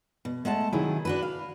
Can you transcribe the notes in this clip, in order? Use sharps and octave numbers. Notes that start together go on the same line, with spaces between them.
B2
G#3 A3 F#5 A5
C3 D#3 F#3 D#4 E4 G#4
D4 F#4 B4
F5